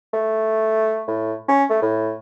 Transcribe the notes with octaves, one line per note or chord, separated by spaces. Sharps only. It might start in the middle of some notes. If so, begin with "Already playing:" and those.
A3
A2
C#4
A3
A2